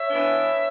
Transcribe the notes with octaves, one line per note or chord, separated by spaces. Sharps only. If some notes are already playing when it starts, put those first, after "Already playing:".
Already playing: C#5 E5
E3 B3 D4